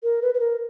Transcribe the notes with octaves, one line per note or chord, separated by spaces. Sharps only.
A#4
B4
B4
A#4